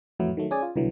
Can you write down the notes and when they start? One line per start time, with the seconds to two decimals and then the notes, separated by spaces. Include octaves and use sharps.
0.19 F2 A2 E3 F#3 E4
0.37 D#3 F#3 A3
0.51 C#4 G#4 D5 G#5
0.62 F4
0.76 C2 B2 D3 E3 F#3